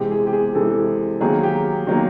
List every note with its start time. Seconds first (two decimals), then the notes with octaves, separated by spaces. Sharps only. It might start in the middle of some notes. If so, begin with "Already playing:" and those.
Already playing: C3 E3 G#3 G4
0.11 G#4
0.27 G4
0.33 G#4
0.54 C3 E3 G#3 A4
1.21 D#3 F#3 A#3 G#4
1.43 G4
1.87 D#3 F#3 A#3